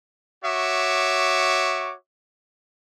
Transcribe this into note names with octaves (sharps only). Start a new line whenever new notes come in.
F#4 C#5 E5 C#6 D6